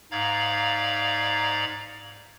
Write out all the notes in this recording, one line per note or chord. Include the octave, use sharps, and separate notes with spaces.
G#2 D5 F5 A#5 G#6